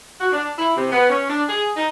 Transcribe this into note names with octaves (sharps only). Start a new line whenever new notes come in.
F#4
D4
E4
C3
B3
C#4
D4
G#4
D#4